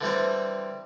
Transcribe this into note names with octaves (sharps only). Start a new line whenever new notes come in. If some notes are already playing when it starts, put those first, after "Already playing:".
D3 E3 G3 C4